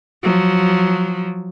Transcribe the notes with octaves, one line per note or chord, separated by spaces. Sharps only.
F3 F#3